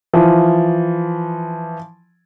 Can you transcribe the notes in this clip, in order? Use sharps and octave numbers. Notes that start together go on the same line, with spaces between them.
E3 F3